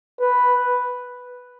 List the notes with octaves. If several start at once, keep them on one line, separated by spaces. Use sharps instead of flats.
B4